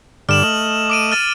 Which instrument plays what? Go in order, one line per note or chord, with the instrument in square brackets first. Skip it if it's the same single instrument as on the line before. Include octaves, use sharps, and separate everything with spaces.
[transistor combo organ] G2 D3 D5 [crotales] F6 E7 F#7
[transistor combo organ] A3 D#5 [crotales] F#7
[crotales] D6 D7 D#7
F6 A6 D#7